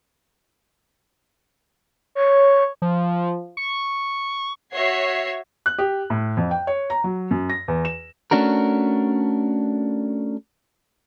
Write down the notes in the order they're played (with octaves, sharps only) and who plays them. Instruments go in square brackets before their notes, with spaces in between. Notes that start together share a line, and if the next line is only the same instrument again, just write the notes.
[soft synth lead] C#5
[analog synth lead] F3
C#6
[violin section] F#4 C#5 E5 G#6 C7
[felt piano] F#6
G4
A2
F2
G5
C#5
A#5
F#3
F#2
A#6
E2
E7
[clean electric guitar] A3 C#4 D4 F#4 A#4